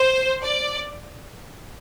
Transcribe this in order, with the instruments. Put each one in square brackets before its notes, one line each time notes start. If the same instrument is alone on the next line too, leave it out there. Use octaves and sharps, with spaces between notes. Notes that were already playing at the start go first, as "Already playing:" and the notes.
Already playing: [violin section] C5
D5